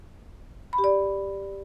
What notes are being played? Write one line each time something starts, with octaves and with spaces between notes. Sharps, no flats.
B5
G4
D5